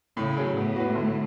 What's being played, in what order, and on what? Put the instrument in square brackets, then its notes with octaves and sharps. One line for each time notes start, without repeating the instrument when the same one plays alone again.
[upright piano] A2 [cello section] C#3
[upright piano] F#3 C#4 G#4
[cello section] A2 [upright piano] B3
[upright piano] F#4 B4
D3